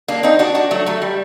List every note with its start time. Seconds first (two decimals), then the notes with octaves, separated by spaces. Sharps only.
0.08 A#3 D4
0.23 C4 D#4
0.39 D4 F#4
0.55 D4 F#4
0.71 F#3 A3
0.86 F#3 A3
1.02 G3